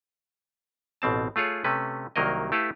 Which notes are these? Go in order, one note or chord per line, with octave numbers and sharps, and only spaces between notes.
A1 B2 C4 A5
A3 F4 G#4 C#5
C3 A3 C#4 B4
C2 D#3 F#3 A#3 A#4 D#5
A3 E4 G4 A4 B4 F5